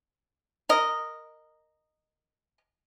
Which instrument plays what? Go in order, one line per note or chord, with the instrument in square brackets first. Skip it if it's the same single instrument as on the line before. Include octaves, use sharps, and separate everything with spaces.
[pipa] A#4 D#5